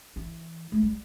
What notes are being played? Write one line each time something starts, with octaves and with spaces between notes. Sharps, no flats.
E3
A3
G3